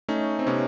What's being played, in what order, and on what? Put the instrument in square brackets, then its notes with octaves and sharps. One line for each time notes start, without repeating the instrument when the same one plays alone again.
[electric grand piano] A3 C#4 D#4
C4
C3 B3 C#4